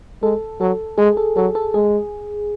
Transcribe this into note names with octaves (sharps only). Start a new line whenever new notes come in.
G#3 A4
F#3 A4
G#3 G#4
A4
F#3 A4
A4
G#3 G#4